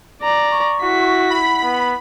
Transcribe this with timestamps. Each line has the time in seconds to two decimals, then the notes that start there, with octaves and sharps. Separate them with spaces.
0.22 D5 A#5
0.51 C#6
0.83 E4 F#4 B6
1.30 F#5 B5
1.63 B3